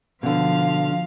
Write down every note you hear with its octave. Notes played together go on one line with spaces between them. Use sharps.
B2 D3 F3 F5